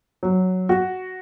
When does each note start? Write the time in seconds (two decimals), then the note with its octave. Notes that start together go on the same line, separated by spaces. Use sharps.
0.23 F#3
0.69 F#4